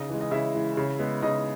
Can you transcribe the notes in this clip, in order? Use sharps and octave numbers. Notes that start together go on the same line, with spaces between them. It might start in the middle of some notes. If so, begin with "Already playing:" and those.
Already playing: C#3 D#4 D#5
E3 G#3
D#5
C#3 E4 E5
E3 G#3
C#3
G#3 B3
C#3 D#4 D#5